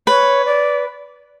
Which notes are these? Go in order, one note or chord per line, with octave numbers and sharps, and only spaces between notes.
B4 C#5
D5